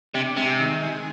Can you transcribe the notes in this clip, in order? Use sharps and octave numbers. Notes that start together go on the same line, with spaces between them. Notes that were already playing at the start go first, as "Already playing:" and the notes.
C3 D4
C3 G#3
D#3
G#3